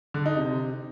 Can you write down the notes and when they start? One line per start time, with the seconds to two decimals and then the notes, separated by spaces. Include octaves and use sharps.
0.14 D3
0.26 D#4
0.37 C3